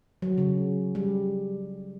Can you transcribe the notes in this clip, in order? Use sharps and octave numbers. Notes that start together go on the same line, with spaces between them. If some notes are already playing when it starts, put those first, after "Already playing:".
F#3
C#3
G3